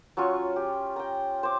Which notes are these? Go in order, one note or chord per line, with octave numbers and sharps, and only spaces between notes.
F#3 C#4 F4 C#6
G4
G5 A#5
C5 D6